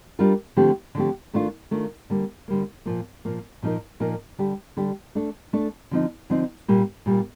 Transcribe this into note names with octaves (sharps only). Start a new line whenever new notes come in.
G3 D4 F4 A#4
D3 F3 A3 C4 G4
D3 F3 A3 C4 G4
D#3 A3 D4 F4
D#3 A3 D4 F4
D3 G3 A#3
D3 G3 A#3
A#2 F3 A#3
A#2 F3 A#3
A#2 F3 A#3 D#4 A#4
A#2 F3 A#3 D#4 A#4
D3 G3 D4 G4
D3 G3 D4 G4
A3 D4 A4
A3 D4 A4
D3 F3 C4 D#4
D3 F3 C4 D#4
A#2 G3 A#3
A#2 G3 A#3